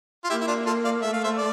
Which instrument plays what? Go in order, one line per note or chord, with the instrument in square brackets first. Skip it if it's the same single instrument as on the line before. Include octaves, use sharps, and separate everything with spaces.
[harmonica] F4
[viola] A#3 [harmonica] E4 G4
[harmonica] E4
D4 F4
F4 A4
D5 F5
[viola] A3 [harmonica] E5
[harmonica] F5
C5 E5
D5